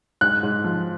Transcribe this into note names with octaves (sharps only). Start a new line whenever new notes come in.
G#2 F#6
G#2
F3